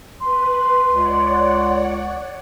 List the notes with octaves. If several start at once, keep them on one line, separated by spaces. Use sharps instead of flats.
B4 C6
C#2 C#5 D5 F#5